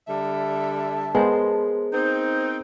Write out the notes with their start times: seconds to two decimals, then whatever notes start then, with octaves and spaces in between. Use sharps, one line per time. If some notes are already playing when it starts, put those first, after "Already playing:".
0.08 D3 G3 E5 A5
1.15 G#3 B3 A#4 C5
1.93 C4 D#4 G6